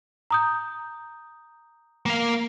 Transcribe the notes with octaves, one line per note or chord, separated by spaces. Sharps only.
A#5 D#6 G6
A#3 F5